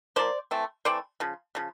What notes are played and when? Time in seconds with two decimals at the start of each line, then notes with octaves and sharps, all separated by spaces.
0.16 F3 A#3 C5 D5
0.51 E3 A3 C4
0.85 E3 A3 C4 C5 D5
1.20 C#3 F3
1.55 C#3 F3